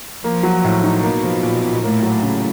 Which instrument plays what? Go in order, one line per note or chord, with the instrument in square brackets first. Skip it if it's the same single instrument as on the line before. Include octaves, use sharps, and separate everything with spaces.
[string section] F3 [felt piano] A#3
[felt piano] F#3
A2
D#4
[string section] B2 [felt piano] A#3
[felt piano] F3
A#2
A#2
[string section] A2 [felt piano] A#3
[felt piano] F#3
C#3